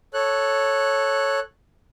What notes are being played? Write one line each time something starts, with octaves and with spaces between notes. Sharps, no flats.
A4 C#5 F#6